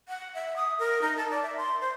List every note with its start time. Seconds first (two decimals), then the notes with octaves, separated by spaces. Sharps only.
0.09 F#5
0.34 E5
0.56 D#6
0.79 A#4
1.02 D#4
1.17 A5
1.31 D5
1.43 E5
1.57 C6
1.81 C5